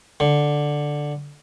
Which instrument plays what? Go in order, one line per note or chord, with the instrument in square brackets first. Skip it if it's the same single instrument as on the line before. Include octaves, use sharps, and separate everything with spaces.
[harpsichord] D3